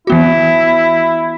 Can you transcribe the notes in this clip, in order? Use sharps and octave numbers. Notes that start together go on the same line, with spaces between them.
E3 B3 E4 F#4